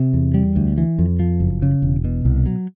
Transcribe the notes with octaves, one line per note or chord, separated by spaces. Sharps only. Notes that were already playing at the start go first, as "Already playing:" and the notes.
Already playing: C3
E2
G3
D2
E3
F2
F3
F#1
C#3
E1
B2
C2
F#3